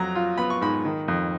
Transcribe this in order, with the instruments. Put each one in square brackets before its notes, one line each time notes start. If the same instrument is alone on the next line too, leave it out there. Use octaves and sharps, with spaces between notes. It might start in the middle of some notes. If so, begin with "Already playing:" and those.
Already playing: [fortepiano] F2 F#3 A#5
F4
B3 B5
C#6
G#2 B5
D#3
F2